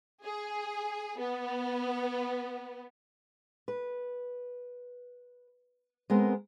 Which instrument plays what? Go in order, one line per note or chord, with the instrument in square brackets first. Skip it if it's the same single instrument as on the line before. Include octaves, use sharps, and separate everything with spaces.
[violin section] G#4
B3
[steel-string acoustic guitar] B4
G#3 B3 C4 A#4